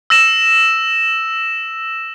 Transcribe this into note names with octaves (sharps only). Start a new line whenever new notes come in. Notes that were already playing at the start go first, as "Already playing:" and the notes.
E6 A#6 E7